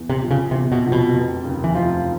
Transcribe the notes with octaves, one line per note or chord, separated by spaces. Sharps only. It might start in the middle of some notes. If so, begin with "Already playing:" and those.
Already playing: E2
C3
C3 F3
C#3
E2 C3
B2
C3
F3
B2
F1
D#2 C#3
E3
F1 F3